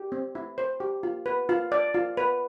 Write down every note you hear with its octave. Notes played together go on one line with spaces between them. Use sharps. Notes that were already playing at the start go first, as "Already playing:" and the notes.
Already playing: G4
C4
E4
C5
G4
F4
B4
F4
D5
F4
B4